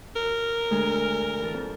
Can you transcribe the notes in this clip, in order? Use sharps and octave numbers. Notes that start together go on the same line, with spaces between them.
A#4
D2 G#3 G#5
E3 A4
F2